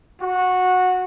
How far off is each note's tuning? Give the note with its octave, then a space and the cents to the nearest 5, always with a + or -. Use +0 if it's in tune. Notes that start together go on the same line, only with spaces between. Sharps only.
F#4 -15